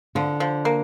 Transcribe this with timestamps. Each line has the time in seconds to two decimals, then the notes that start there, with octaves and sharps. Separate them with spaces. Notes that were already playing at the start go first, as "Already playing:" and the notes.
0.15 D3 F3
0.40 F3
0.65 A#3